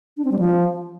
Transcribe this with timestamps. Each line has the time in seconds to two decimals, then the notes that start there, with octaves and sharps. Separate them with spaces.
0.17 D4
0.24 C4
0.32 G3
0.39 F3